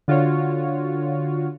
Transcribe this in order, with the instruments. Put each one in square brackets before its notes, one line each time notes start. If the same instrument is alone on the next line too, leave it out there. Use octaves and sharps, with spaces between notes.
[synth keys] D3 F4 F#4 C#5